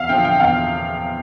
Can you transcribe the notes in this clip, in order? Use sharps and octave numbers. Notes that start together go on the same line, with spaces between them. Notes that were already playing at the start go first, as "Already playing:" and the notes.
Already playing: E2 E5 F5
D3 F3 G5
G5
E2 F5